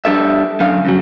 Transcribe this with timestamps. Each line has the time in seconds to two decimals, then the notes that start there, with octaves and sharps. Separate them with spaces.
0.05 G3 D4 A4 E5
0.60 F#2 D3 F5
0.85 F#2 C#3 F#3